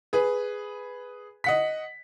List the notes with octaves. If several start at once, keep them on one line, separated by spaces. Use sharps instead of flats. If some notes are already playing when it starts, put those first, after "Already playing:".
G#4 B4
D#5 F#5 B6